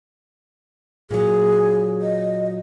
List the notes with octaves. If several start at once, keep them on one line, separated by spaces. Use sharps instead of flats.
A#2 F#3 G#4
D#5